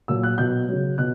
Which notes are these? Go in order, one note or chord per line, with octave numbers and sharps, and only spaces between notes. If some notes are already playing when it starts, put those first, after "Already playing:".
A#2 F#3 E6
F#6
B2 F#3 G6
C#3 F#3
B2 F#6